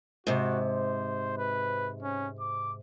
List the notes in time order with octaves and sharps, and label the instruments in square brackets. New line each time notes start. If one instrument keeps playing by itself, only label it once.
[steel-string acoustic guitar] G#2 C3 [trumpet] F#4
[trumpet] C5
B4
C#4
D6